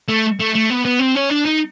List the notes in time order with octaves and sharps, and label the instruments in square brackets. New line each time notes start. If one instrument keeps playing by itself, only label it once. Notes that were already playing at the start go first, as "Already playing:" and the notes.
[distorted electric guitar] A3
A3
A3
B3
B3
C4
C#4
D4
D#4